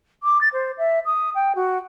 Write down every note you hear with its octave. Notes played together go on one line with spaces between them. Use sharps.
D6
A6
C5
E5
D#6
G5
F#4